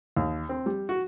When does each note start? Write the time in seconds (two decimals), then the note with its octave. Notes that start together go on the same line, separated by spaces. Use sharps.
0.17 D#2
0.49 C4
0.66 G3
0.89 F#4